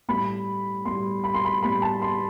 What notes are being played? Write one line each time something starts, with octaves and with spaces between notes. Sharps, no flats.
A2 G3 B5
A2 G3 C6
B5
C6
B5
A2 G3 B5
A5
C6